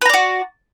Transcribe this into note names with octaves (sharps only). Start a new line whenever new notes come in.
F#4 B4 D5 A#5